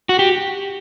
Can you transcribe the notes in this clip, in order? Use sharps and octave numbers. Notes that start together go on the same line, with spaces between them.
F#4
G4